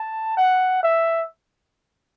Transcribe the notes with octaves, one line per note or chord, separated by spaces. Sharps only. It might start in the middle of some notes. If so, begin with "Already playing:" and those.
Already playing: A5
F#5
E5